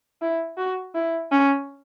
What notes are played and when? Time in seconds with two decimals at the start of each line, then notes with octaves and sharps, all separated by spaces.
0.22 E4
0.58 F#4
0.95 E4
1.32 C#4